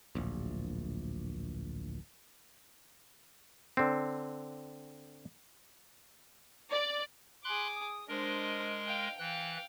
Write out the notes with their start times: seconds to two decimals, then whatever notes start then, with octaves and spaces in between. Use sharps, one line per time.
0.15 D1 A#1
3.77 D3 C4
6.72 D5
7.44 G#4 B5 C6 D6 F#6
7.75 D#6
8.09 G#3 D4 A#4 C5 D#5
8.87 F5 G5
9.19 E3 F5 G5 F#6